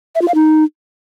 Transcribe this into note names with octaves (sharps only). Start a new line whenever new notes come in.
E5
F4
F5
D#4